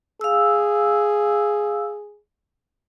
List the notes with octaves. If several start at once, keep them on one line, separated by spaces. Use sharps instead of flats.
G#4 F5 E6